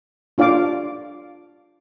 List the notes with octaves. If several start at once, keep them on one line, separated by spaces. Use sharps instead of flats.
D4 F4 D5 F5 D6